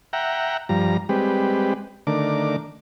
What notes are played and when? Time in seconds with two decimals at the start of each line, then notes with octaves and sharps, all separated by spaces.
0.13 E5 F#5 G5 A#5
0.69 G2 F3 G3 A#5
1.09 G3 G#3 C4 G4 B4
2.07 D3 D#3 A3 D4 A#4 D6